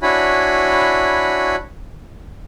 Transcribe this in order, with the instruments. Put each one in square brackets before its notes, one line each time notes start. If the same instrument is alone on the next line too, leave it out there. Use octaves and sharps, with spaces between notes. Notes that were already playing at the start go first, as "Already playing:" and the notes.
[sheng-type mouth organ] D4 E4 F#4 C#5 G#5 B5